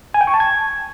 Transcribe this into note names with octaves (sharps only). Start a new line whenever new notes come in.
G#5
G5
C#6
A5
G#6